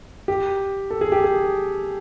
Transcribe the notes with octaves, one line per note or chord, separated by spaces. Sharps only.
G4
A4
G#4
G4
G#4